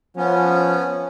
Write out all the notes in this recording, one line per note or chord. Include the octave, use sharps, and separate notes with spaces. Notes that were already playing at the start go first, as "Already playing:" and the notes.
F3 B3 C#4